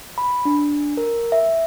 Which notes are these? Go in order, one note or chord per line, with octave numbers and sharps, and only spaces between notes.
B5
D4
A#4
E5